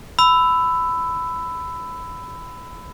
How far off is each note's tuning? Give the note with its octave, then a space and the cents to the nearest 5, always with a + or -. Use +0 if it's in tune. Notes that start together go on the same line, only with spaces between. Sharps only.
B5 +20 E6 +0